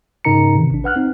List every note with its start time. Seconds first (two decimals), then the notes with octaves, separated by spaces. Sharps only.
0.25 G#2 C#3 D#4 A#4 A#5 C#7
0.55 C3 D#3 E3
0.71 A1 D4
0.84 B4 F#5 F6 F#6
0.96 C4 D#4